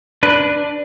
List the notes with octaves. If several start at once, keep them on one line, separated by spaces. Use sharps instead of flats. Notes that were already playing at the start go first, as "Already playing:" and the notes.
D4 B4